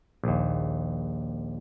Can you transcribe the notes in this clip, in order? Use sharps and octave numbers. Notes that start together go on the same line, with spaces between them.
A#1 D#2